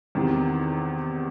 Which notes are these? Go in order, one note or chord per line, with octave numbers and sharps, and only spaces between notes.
E2 C3 D#3